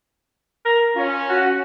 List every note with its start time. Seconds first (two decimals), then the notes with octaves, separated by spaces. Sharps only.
0.65 A#4
0.96 C#4 F4
1.29 F#4